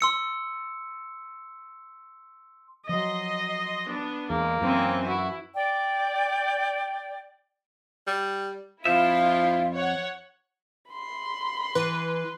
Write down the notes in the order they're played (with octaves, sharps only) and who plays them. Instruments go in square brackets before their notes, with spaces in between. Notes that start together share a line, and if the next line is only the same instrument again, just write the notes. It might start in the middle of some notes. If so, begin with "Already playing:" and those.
[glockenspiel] C6 E6 C#7
[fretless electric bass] F3 F#3 [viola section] D#5 C6
[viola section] B3 D4
[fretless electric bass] E2 [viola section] G#3 [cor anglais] A#3
[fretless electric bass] F#2 [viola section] E3 C4 G#5
[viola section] E4 [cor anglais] F#4
[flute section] D5 G5
[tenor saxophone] G3
[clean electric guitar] F2 E5 [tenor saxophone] F3 [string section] E4 F4 [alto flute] F5
[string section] C#5 F#5
[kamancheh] B5 C6
[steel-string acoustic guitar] E3 [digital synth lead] B4